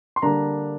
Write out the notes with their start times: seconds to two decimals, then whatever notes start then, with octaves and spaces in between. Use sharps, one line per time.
0.16 C6
0.22 D3 G3 A#3 D4 A#5